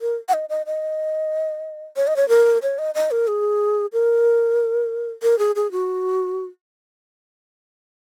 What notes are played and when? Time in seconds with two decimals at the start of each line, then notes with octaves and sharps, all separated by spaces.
0.01 A#4
0.29 F#5
0.33 D#5
0.49 D#5
0.66 D#5
1.96 C#5
2.07 D#5
2.16 C#5
2.29 A#4
2.63 C#5
2.78 D#5
2.95 D#5
3.11 A#4
3.28 G#4
3.93 A#4
5.23 A#4
5.39 G#4
5.56 G#4
5.72 F#4